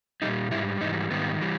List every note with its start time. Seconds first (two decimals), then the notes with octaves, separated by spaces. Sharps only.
0.22 A#2 G3 D#4
0.51 G#2 G3 E4
0.81 G#2 E3 G3 D#4
1.11 G#2 D#3 G3 B3
1.42 E3 G3